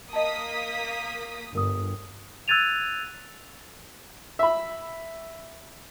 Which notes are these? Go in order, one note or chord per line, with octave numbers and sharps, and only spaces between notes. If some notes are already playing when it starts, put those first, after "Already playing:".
A#3 D#5 A5 D#6 B6
G1 A#4 D#6
E6 F#6 G#6 A6 D#7 F7
E5 B5